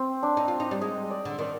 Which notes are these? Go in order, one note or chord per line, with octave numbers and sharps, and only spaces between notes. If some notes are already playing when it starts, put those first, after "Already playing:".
Already playing: C4
D4
D#4
F4
D#4
G3
G#3 D#5
D5
D3
D#3 D5